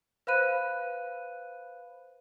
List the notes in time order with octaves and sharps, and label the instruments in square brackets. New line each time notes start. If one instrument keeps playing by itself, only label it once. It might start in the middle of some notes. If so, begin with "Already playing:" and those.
[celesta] B4 C5 F5 B5 F#6 D#7